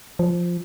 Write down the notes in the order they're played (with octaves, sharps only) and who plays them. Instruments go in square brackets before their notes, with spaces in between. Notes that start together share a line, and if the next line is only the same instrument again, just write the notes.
[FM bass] F3